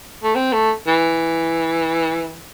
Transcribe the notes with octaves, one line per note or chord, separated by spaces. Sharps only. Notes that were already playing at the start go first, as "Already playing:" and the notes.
A3
C4
A3
E3